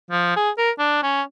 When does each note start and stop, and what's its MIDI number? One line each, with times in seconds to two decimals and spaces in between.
0.11 0.36 53
0.36 0.50 68
0.58 0.70 70
0.79 1.02 62
1.03 1.22 61